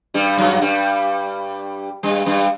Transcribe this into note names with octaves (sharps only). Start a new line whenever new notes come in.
G2 G3
F#2 F#3
G2 G3
G2 G3
G2 G3